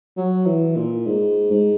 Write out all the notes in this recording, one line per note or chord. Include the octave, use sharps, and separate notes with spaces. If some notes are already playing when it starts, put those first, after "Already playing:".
F#3
E3
A#2
G#2
G#2